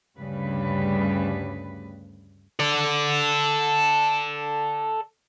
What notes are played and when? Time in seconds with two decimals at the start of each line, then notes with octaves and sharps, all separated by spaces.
0.18 D2 G2 C#3 G3 B4
2.60 A4 D5